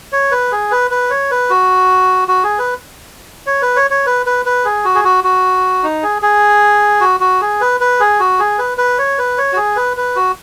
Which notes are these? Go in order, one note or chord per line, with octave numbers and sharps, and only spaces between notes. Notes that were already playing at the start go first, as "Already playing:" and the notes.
C#5
B4
G#4
B4
B4
C#5
B4
F#4
F#4
G#4
B4
C#5
B4
C#5
C#5
B4
B4
B4
G#4
F#4
G#4
F#4
F#4
D#4
G#4
G#4
F#4
F#4
G#4
B4
B4
G#4
F#4
G#4
B4
B4
C#5
B4
C#5
F#4
G#4
B4
B4
F#4